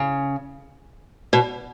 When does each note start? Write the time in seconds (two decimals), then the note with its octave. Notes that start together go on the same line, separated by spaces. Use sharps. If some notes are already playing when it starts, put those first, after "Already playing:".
Already playing: C#3
1.33 B2